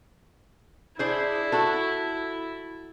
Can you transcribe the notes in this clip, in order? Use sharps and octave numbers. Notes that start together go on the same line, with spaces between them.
D4 E4 G#4 C5
F#4 A4